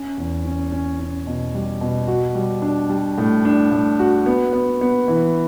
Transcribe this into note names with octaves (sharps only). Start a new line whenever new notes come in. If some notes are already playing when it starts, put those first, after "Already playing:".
Already playing: C#4
E2
C#4
C#4
C#4
B2
G3
B2
F#4
G3
D4
G3
A2
D4
A2
F#4
B3
B3
B3
E3